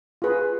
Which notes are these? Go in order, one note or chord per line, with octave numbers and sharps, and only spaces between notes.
F4 G#4 B4